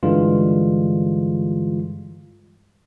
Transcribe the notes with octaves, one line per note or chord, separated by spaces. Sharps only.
G2 D3 E3 G3 G#3 F4